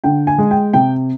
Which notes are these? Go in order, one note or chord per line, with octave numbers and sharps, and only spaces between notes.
D3 G5
G#5
G#3
G5
C3 G5